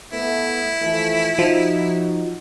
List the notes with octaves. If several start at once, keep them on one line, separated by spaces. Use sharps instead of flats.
A3 B3 E4
E3 F3 A3
F3 D#4 F#4